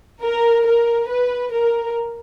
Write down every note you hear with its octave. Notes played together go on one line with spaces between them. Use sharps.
A#4
A#4
B4
A#4